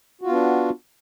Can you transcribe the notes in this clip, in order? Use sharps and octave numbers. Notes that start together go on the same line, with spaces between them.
B3 D4 F4 F#4